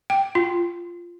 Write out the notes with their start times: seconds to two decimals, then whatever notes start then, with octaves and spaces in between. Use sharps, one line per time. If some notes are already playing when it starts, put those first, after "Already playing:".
0.10 G5
0.35 F4